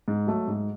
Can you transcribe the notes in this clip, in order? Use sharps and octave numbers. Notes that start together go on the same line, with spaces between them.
G#2
F#3 A3
G#2